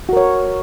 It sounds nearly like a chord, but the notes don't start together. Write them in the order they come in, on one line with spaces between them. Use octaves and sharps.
F#4 A#4 C#5